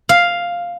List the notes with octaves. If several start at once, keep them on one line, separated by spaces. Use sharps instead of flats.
F5